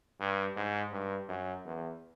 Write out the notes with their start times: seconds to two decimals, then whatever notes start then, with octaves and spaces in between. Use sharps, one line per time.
0.20 G2
0.57 G#2
0.92 G2
1.29 F#2
1.65 E2